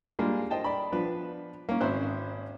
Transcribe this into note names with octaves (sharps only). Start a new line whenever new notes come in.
G3 G#3 A#3 D4 F4
C5 D#5 G5 A5
D5 B5
F3 B3 D4 B4
A#3 C#4
G#1 C#4 C5 E5 F#6